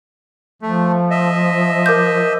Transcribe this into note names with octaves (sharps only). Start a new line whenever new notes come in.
F3 A3
D#5 E5
A#4 D6 G6